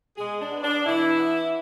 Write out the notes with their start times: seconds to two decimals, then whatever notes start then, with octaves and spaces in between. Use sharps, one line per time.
0.17 B2 G#3 G#4
0.40 D4
0.51 B3
0.63 D4
0.84 B2 E3 E4
1.19 B3